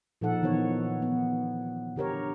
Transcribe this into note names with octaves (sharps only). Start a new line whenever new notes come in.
A#2 F3 D#4 A4 F#5
D#3 E3 B3 C#5
B3
D3 G4 A#4 C#5